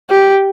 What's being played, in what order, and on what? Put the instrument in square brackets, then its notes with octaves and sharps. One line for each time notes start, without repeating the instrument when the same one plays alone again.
[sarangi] G4